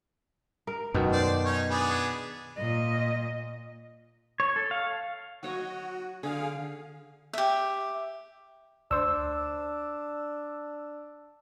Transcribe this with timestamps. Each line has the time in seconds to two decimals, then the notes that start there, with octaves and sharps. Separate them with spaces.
0.67 A#4
0.94 F#2 B2 D#3
1.12 C5 D5
1.45 C#4 D#4 C#5
1.70 B3 D4 G#4
2.58 A#2 D#5
4.40 C#5
4.56 A4
4.71 F5
5.43 F#3 F#4 C#5 D#5
6.23 D3 G#4 F5
7.33 G4 E5
8.91 D2 D4 C5 E6